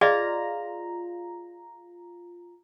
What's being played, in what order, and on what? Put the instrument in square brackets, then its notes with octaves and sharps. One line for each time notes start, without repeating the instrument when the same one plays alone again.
[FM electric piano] F4 A#5 [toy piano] G#4 D5 D#5